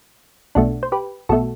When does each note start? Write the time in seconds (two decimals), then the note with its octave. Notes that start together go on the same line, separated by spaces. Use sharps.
0.55 B1 B2 A3 D4 F#4
0.83 C5
0.92 G4 B4
1.29 B1 B2 A3 F#4 A4